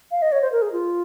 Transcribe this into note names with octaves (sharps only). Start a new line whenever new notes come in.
F5
D#5
C#5
C5
A#4
G#4
F4